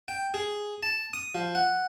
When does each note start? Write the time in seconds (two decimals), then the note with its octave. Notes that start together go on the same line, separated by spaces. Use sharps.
0.08 G5
0.34 G#4
0.83 A5
1.13 D#6
1.35 F3
1.55 F#5